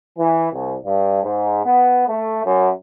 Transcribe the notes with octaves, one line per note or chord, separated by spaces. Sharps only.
E3
C2
G2
G#2
B3
A3
F#2